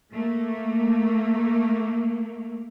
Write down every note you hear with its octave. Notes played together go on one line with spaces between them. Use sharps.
A3 A#3